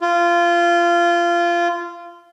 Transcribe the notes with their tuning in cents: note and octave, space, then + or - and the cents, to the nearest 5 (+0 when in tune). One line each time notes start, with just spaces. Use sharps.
F4 -20